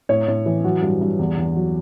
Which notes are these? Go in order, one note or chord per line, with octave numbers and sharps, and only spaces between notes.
A2 C#5
A2
E3
F#3 F#4
G2
G2
E2
E2
F#3